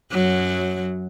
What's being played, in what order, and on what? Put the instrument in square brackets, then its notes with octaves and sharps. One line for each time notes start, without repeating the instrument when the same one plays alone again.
[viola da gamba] F#2 F#3